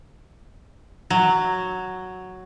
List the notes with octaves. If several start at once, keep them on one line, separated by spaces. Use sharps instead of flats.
F#3